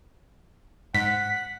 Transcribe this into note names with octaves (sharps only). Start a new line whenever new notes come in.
G#2 F#5 B6